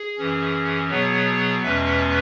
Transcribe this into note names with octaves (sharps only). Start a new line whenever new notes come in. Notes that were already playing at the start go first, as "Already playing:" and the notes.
Already playing: G#4
F#2 E3 C#4
B2 F#3 B3 G#4 C#5
E2 B2 G#3 C#4 B4 E5